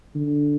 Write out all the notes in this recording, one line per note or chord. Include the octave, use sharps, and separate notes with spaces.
D3